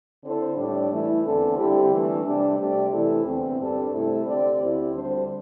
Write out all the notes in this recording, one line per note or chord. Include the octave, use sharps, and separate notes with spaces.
D3 C4 E4 A4 C5
A2 G3 D4
E3 A3 E4
E2 D3 C4 A4
D3 G3 C4 E4 G4
E3 A3 D4
C3 G3 D4
C3 A3 D4 G4 D5
C3 E3 A3 E4 A4
E2 D3 C4
G2 G3 D4 A4 C5
C3 A3 C4 E4 A4
D3 C4 G4 D5
D2 D3 C4 E4 G4
D2 D3 G3 D4 C5